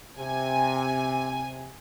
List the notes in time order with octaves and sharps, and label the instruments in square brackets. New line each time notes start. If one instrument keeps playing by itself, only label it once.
[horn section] C3 [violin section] G#5